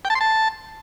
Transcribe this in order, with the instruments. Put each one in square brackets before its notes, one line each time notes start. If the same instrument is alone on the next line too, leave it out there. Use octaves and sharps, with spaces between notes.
[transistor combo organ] G5
A5
C6
A5